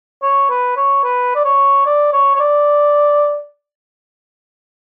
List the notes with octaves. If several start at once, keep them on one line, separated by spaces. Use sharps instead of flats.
C#5
B4
C#5
B4
D5
C#5
D5
C#5
C#5
D5